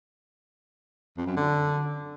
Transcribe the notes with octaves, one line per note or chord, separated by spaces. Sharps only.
F2
F#2
D3